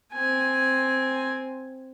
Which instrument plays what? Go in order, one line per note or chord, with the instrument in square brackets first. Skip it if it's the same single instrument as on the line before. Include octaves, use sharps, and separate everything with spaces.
[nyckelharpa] C4 G#5